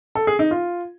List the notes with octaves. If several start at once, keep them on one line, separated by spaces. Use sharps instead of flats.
A4
G#4
D#4
F4